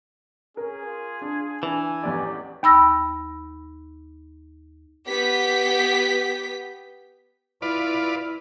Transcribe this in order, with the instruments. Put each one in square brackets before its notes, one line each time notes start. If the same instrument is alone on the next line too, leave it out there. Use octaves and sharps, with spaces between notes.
[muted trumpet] C#4 [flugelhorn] G#4 [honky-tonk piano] A#4
[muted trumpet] F4
[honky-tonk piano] D4
[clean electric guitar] E3 [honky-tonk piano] D4 [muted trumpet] G#5
[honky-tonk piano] A1 E2 D5 [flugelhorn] G4
[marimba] D#2 B5 E6 A#6
[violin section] B3 G4 G5 B6
[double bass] E4 [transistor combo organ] F4 B4 D5